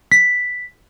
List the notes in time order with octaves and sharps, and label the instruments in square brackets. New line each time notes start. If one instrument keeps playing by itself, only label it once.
[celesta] B6